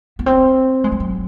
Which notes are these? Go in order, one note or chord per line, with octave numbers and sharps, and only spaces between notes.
B3
C4
G#3
G3
F#3